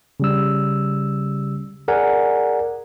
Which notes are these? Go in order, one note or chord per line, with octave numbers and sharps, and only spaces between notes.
C#3 G3 E6
G#4 A#4 D5 F#5 G#5